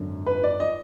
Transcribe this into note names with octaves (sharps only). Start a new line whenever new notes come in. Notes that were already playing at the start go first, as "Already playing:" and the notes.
Already playing: G#1 F#2 D3
B4
D5
D#5